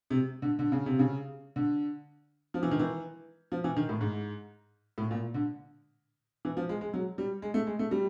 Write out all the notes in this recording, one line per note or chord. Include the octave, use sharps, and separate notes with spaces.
C3
D3
D3
C#3
C3
C#3
D3
F3
E3
D#3
E3
F3
E3
D#3
A2
G#2
A2
A#2
D3
E3
F3
G#3
G#3
F#3
G3
G#3
A3
G#3
A3
G3